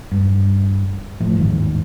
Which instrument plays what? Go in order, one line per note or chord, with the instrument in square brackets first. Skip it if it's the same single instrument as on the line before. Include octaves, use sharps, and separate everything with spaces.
[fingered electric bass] G2
A2 F3 A3
G1 D#2 G#2 D#3